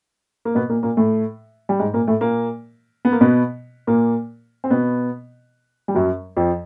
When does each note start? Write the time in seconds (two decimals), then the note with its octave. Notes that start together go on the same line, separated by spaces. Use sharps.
0.45 A#3
0.55 B2 B3
0.69 A#2 A#3
0.83 A#2 A#3
0.97 A2 A3
1.69 G3
1.79 G#2 G#3
1.93 A#2 A#3
2.07 A2 A3
2.21 A#2 A#3
3.05 B3
3.12 A#3
3.21 B2 B3
3.87 A#2 A#3
4.64 C4
4.70 B2 B3
5.88 G3
5.95 F#2 F#3
6.37 F2 F3